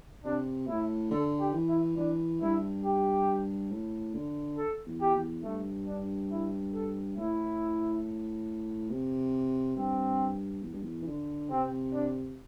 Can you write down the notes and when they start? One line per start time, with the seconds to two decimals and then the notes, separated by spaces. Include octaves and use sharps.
0.25 C3 D4
0.67 A2 E4
1.11 D3 A4
1.40 G4
1.54 E3
1.68 E4
1.97 E3 D4
2.41 G2 E4
2.84 G4
3.71 A2
4.15 D3
4.57 A4
4.86 E2
5.01 G4
5.15 E2
5.44 G2 A3
5.87 D4
6.31 E4
6.74 A4
7.17 A2 E4
8.90 C3
9.76 G2 C4
10.63 E2
10.73 G2
10.83 E2
11.03 E3
11.07 D3
11.50 C3 C4
11.93 D4